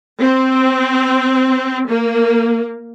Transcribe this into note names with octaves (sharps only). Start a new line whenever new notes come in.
C4
A#3